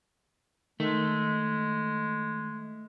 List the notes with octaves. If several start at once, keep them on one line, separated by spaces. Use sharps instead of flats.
D#3 G#3 A3